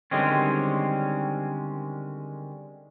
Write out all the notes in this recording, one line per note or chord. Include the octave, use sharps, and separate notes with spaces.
D3 D#3 G3 G#3 C4 C#4